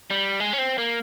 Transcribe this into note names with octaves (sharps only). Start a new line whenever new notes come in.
G3
G#3
C#4
C4
A#3